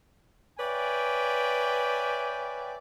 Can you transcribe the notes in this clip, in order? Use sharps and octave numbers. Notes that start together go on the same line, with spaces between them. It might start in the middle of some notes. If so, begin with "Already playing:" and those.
B4 C#5 D5 E5 G5 G#5